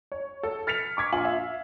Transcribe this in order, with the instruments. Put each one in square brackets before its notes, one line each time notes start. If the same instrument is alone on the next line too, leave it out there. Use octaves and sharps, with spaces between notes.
[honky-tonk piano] C#5
A4
F6 A6 B6 C#7 F7
C#6 D6 G#6 B6
A#1 F4 G#5 F#7
E5 F5